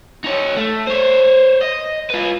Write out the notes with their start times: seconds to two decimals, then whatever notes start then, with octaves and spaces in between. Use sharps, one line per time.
0.24 D#4 C#5
0.56 A3
0.87 C5 C#5
1.61 D#5
2.10 F4 B4